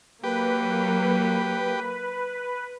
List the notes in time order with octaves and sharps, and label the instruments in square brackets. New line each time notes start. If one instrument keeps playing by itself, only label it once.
[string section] F#3 A#3 [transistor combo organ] G4 [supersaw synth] B4